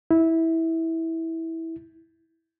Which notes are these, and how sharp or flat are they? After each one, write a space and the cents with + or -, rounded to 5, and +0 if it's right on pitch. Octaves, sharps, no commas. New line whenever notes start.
E4 -15